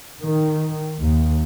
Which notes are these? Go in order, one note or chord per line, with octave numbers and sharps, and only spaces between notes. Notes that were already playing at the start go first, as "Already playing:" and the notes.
D#3
D#2